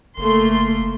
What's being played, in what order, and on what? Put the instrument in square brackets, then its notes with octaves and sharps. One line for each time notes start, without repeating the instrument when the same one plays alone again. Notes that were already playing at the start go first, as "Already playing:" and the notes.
[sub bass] F#1 [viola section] A3 A#3 C6